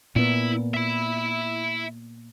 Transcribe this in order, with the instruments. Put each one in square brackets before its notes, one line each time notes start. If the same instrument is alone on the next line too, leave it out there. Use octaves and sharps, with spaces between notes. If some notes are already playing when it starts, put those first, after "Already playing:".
[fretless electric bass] A#2 B3 [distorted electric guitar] E4
[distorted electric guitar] E5 B5